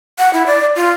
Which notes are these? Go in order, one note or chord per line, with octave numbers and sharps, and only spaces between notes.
F#5
E4
D5
F4